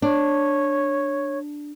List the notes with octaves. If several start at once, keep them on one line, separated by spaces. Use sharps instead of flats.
D4 C#5